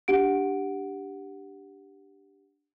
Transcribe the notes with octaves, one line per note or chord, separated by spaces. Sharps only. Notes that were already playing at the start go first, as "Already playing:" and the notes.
D4 G4 F#5 D7